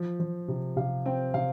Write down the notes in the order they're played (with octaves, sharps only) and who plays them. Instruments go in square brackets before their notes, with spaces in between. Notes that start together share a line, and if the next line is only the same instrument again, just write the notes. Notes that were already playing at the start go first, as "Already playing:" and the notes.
Already playing: [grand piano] F3
F3
C3
C3 F5
C4 G5
C3 F5